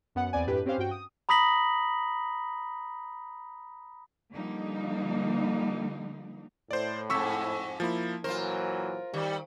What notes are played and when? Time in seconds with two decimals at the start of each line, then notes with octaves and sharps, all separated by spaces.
0.15 F#2 B3 F#5
0.33 E2 B3 C4 D5 G#5
0.47 F#2 A2 D4 G4 B4
0.66 C4 C#4 G4 B4 C5 F5
0.78 G2 F#4 G5
0.91 D#6
1.29 A#5 B5 D#6 A#6 B6 F#7
4.33 D3 F3 G3 A#3 D#4
6.71 A2 C5 D5
7.10 F2 G#2 C#6 E6 B6
7.80 F3 A#3 E4
8.24 A#2 E3 F#3 F4 A#4 C5
9.14 D#3 G3